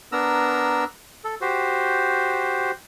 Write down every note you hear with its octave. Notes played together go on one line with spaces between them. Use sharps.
B3 D4 A#4 A#5 E6
A4
F#4 G4 C5